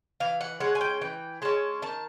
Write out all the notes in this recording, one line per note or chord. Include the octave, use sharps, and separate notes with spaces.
E3 F5
F#5
G#3 C#4 F#5
G#5
G5
E3 G5
G#3 C#4 A5
D#3 A5